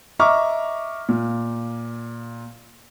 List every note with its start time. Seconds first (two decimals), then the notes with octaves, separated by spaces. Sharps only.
0.19 D#5 E5 A#5 C#6 D6 F6
1.09 A#2